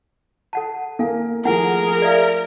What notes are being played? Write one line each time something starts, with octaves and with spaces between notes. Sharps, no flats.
A4 F#5 A5
A#3 A4 A#4 F5 G#5
F3 A3 G#4 A#4 F#5 G#5
D5 E5 F5